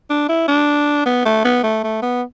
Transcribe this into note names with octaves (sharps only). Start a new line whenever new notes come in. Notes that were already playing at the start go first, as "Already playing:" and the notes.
D4
E4
D4
B3
A3
B3
A3
A3
B3